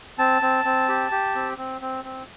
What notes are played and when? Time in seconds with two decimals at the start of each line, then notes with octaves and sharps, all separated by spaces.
0.18 C4 A5
0.42 C4
0.65 C4
0.88 G4
1.11 G4
1.35 C4
1.57 C4
1.81 C4
2.04 C4